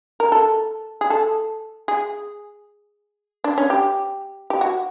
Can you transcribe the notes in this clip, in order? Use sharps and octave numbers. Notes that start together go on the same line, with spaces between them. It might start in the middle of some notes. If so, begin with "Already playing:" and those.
A#4
A4
G#4
A4
G#4
D4
C#4
G4
G4
F#4